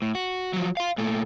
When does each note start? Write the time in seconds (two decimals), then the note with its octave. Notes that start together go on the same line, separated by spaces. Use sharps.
0.02 A2
0.15 F#4
0.53 F3 F#3
0.77 F5 C6
0.98 A#2 A3